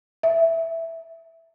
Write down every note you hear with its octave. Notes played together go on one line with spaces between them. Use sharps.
E5